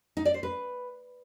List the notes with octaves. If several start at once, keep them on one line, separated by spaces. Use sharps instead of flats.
D#4
D5
C5
B4